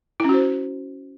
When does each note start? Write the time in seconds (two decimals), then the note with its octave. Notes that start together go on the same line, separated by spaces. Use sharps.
0.20 E4
0.24 C#4
0.29 F#4
0.34 C5